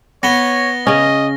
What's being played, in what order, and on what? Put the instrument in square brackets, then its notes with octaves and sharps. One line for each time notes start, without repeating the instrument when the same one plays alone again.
[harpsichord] B3 [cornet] C#5 [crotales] A#6 G7
[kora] C#3 C#4 [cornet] D#5